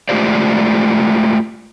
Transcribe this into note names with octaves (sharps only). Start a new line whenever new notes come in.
G#3 A3 F4 G4 C5 D5